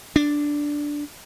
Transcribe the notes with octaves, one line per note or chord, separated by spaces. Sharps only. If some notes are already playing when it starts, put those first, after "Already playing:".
D4